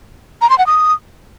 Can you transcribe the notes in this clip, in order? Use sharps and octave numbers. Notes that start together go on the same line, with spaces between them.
A#5
C6
F#5
D#6